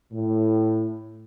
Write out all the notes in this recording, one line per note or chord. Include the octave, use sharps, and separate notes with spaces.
A2